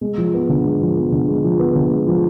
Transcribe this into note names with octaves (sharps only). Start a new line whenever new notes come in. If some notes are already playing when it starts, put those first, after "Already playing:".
G#3
F3
B3
D3
G#3
F3
B3
D3
G#3
F3
B3
D3
G#3
F3